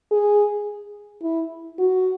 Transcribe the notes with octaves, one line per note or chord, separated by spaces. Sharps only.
G#4
E4
F#4